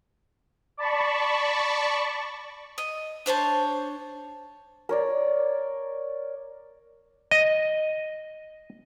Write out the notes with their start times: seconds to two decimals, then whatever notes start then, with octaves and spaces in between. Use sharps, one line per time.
0.77 D5 A5 B5 C#6
2.78 D#5
3.26 D4 C5 C#5 A5
4.89 A#4 C#5 D5
7.31 D#5